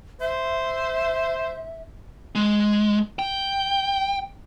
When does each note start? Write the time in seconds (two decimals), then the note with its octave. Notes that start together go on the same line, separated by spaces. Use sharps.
0.21 C5 E5
2.35 G#3
3.19 G5